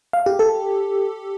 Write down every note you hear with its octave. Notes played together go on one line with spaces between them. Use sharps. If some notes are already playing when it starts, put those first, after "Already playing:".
F5
G4
A4